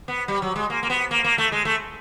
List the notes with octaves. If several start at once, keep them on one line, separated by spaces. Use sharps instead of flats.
B3
G3
F#3
G#3
A#3
A#3
B3
A#3
A#3
A3
G#3
A3